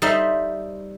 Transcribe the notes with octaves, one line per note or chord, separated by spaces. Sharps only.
G3 D#4 C5 E5 C6